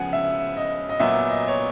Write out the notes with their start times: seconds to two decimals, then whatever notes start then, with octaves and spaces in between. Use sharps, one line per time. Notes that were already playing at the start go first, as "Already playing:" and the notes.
Already playing: C#3 F3 G#3 B3 F#5 G#5
0.13 E5
0.57 D#5
0.89 D#5
1.00 A#2 F#3 B3 E5
1.29 D#5
1.48 C#5